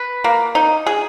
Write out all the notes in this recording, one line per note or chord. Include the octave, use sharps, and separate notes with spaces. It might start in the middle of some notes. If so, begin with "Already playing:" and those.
Already playing: B4
A#3
D#4
G#4